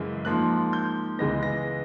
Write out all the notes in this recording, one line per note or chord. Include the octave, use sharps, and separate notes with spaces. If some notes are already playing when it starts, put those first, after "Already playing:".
Already playing: F#2 C#3 E3 G#3
G#2 F3 A#3 F#6
G6
C#2 C#3 E3 G#3 B3 A#6
A#6